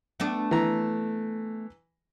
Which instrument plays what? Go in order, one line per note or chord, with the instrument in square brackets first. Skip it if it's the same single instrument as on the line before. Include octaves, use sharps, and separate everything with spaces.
[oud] A3 B3 D4
[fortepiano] E3 A#5